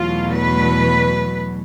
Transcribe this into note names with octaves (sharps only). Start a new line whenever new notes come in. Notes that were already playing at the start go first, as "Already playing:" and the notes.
Already playing: E2 B2 F#3 A3 F4
B4